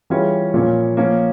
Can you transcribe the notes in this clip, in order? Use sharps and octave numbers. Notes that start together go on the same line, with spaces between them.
E3 G3 C#4 F4 G#4
A#2 F3 A#3 C#4
F3 A#3 C#4